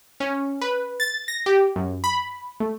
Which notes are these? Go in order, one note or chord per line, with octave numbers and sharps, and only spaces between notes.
C#4
B4
A6
A#6
G4
F#2
B5
A3